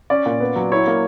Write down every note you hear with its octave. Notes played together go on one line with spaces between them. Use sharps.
C#4 D5
A#2
B3
F#3
E4 C#5
A#3